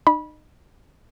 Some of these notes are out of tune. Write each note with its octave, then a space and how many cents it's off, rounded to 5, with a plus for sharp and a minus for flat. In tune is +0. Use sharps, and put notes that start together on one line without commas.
D#4 -30 B5 -20